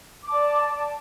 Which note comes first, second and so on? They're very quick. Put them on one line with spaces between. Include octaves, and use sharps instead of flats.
D6 A5 D5